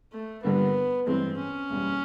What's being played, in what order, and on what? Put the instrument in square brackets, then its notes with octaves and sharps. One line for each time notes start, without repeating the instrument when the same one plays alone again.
[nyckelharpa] A3
[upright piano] G1 G2 D3 G3 A#3 [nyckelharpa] B3
[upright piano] A1 G2 E3 G#3 [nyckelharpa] C4
[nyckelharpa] C#4
[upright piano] F#1 E2 B2 G3 B3